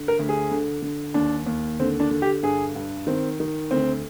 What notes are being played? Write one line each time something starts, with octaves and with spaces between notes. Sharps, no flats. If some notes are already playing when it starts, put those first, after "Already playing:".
Already playing: D3
A#4
D2
G#4
D3
D3
D#2 D4
D#2
D3 C4
D4
D3
G4
G2 G#4
G2
D#3 C4
D#3
D2 C4